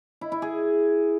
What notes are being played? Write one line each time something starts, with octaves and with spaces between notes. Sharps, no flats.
E4
E4
G#4